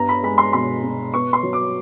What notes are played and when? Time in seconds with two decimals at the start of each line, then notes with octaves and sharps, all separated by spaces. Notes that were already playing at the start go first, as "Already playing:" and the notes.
Already playing: G2 B3 A#5
0.09 B5
0.23 G#3 B5
0.38 C6
0.53 B2 C6
0.83 B2
1.13 B3 C#6
1.33 C6
1.43 F#3
1.53 D6